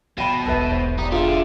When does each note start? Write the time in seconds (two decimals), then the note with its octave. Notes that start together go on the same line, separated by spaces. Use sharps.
0.18 B2 E3 G5 B5
0.46 E1 B1 A4 B4 E5
0.71 C5
0.98 D#4 G4 D5
1.12 D3 F4 G#4 E5